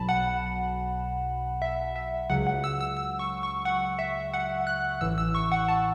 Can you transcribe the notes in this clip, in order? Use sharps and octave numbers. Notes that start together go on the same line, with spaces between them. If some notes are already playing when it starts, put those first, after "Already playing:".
Already playing: B1 B2 F#3 A5 B5
F#5
E5
E5
C#2 C#3 F#3 F#5
F#5
E6
E6
E6
C#6
C#6
F#5
E5
F#5
F#6
A1 A2 E3 E6
E6
C#6
F#5
A5